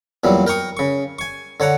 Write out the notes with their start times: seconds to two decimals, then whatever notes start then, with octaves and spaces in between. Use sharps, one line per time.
0.24 E2 A#2 F#3 G3
0.47 A#4 G5 A#5 C#6 D#6
0.77 C#3 C#6
1.19 G#5 C#6
1.60 D3 C#5 F#5 A#5